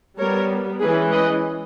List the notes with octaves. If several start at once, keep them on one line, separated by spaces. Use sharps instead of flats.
G3 B3 A#4 C#5
E3 G#3 C#4 G#4 B4
B4 D#5